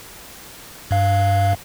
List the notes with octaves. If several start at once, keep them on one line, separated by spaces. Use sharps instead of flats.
G2 F5